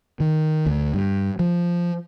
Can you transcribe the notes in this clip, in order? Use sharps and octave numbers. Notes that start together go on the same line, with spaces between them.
D#3
D2
G2
F3